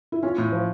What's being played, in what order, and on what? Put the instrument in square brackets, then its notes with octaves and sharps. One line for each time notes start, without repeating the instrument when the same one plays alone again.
[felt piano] E4
[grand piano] C#4 [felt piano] F4
[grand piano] A2
F3